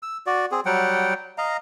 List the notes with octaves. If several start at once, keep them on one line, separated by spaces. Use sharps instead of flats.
E6
F#4 D5
C4 G#4
F#3 G3 F#5 G5
D#5 F5 A#5